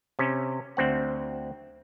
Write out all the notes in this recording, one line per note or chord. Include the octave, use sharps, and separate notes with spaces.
C3 C#4
D2 C4 F#5